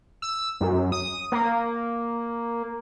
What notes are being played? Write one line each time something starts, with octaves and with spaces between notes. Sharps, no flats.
E6
F#2
D#6
A#3